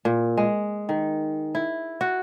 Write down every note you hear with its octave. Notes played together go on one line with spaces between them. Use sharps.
A#2
G#3
D#3
E4
F#4